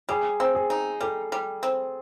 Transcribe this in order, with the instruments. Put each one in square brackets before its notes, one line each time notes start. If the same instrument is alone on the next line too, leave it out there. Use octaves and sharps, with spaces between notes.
[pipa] G3 [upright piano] G#4
[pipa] C4
[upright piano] G#4
[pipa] D#4
[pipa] G3 [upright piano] A4
[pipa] G3
C4